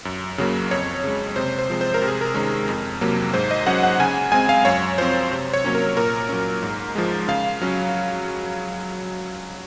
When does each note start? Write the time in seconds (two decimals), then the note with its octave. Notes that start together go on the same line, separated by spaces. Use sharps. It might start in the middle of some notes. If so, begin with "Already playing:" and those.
0.05 F#2
0.38 C#3 F#3 A#3
0.71 F2 C#5
1.04 C#3 G#3
1.36 C3 C5
1.58 C5
1.70 F3 G#3 C4
1.81 C5
1.94 A#4
2.02 C3
2.08 G#4
2.21 A#4
2.35 D#3 G#3 C#4
2.68 F2
3.01 C3 F#3 A#3
3.34 G#2 C5
3.51 D#5
3.66 F#3 C#4 F#5
3.83 F#5
4.00 C#3 G#5
4.32 G#3 C4 G#5
4.49 F5
4.65 F#2 C#5
4.98 F3 C4 C5
5.31 C3
5.53 C#5
5.64 F#3 A#3 C#4
5.75 A#4
5.97 A#2 A#4
6.29 F#3 C#4
6.62 G#2
6.95 F3 G#3
7.28 C#3 F5
7.61 F#3 C#4